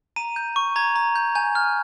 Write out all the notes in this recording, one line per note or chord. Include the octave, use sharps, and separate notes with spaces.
A#5 D#7
G6
C#6
A#5 G#6
A#5
G6
G#5 G6
F6